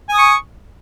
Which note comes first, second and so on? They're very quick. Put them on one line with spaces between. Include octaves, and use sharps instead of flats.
G#5 D#6 C#6